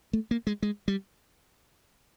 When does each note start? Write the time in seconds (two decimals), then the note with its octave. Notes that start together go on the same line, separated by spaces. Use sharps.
0.13 A3
0.31 A#3
0.47 G#3
0.63 G#3
0.88 G3